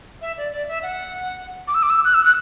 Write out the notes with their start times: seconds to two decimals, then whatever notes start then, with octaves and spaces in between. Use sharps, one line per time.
0.22 E5
0.38 D5
0.53 D5
0.68 E5
0.83 F#5
1.68 D6
1.74 E6
1.83 D6
1.90 E6
2.05 F#6
2.14 E6
2.25 F#6